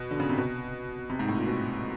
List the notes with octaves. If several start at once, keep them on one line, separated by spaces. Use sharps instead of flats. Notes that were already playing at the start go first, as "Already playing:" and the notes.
Already playing: B2
D3
C#3
C3
B2
C3
G#2
A2
A#2
B2